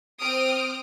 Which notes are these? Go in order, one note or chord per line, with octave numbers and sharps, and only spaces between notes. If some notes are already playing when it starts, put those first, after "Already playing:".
C4 D#6 F6 D7